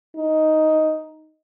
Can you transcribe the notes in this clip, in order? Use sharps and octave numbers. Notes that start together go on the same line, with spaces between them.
D#4